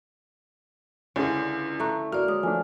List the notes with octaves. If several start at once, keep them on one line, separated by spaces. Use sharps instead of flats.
C#2 D3 C#4 D4 E4 G#4
A3 A#5 C#6 F#6
A#3 F#4 D5 F6
G#3 C#5 D#6
F3 A3 D4 G#5